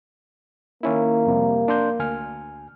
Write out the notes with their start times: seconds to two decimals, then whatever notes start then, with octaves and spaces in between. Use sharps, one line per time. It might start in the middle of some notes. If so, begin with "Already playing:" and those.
0.83 D#3 A#3 C#4 E4
1.26 F2 C3 G3
1.68 D4 C6 G6
1.99 D2 G#5 F6